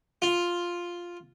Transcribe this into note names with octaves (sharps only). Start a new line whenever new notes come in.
F4